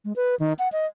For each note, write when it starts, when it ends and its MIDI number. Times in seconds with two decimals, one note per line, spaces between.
0.05 0.13 56
0.16 0.35 71
0.40 0.53 51
0.59 0.68 78
0.72 0.86 75